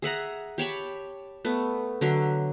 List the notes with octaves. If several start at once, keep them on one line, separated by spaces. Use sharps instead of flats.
G#4 E5 F#5 A#5
G4 C#5 A5 B5
A3 B3
D3 F#3 E5